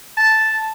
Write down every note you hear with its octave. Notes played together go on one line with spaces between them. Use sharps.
A5